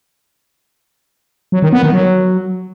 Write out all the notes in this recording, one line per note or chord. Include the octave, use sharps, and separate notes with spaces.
F#3
D#3
B3
D#3
F#3